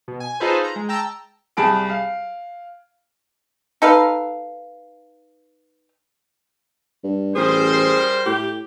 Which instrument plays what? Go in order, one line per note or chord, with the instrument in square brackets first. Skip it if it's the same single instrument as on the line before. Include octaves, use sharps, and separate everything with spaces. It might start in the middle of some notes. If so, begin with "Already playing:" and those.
[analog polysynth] B2
G#5
D#4 F4 G#4 A4 B4 C5
A#5
G#3
G5 A5 A#5 E6
[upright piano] C2 G#4 A5 B5 D7
F5
[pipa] D#4 A4 B4 F5
[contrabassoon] G2
[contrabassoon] A1 [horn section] G3 A#4 C5 [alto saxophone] G#4
[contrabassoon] A2 [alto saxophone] G4